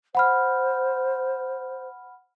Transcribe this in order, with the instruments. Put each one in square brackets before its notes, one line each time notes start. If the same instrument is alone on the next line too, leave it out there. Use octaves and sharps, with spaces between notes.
[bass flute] C5 [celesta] F#5 B5 F6